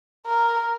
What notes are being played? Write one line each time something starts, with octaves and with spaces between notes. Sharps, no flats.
A#4